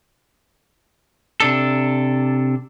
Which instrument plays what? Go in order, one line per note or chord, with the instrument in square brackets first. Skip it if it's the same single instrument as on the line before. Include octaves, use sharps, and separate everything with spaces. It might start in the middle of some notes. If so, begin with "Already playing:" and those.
[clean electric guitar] C3 D4 A4